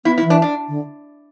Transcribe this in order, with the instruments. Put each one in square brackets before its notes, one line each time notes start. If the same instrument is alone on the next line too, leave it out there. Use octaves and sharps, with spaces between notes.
[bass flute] B3 [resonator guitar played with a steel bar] E4
[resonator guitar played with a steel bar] E4
[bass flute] E3
[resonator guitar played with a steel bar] D4
D4
[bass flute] D3